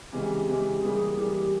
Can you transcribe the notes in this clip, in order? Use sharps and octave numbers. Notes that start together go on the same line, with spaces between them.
C#3 E3 G#3 C4 G4
C#3 E3 G#3 C4
E3 G3 A#3 G#4
E3 G3 A#3 G4